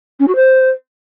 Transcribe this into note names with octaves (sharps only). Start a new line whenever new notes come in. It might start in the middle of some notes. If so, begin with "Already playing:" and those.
C#4
F#4
C5